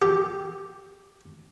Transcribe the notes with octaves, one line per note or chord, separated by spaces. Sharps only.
G4